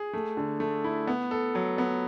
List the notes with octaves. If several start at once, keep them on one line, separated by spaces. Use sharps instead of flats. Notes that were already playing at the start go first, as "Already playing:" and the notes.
Already playing: G#4
A3
D3
A3
E4
B3
A4
F#3
B3